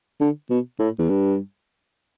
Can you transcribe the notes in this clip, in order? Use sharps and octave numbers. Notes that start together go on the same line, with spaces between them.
D3
B2
A2
E2
G2